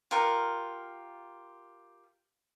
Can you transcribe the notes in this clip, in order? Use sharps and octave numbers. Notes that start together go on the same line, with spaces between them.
F4 G4 A#4 F#5